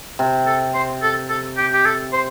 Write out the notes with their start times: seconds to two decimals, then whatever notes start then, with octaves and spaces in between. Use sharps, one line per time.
0.19 C3
0.47 A4
0.74 C5
1.03 A4
1.30 A4
1.58 G4
1.74 G4
1.86 A4
2.13 C5